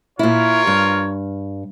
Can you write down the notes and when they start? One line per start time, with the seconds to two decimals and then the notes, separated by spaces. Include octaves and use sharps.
0.19 A#2 E4 F4 A#4 C#5
0.67 G2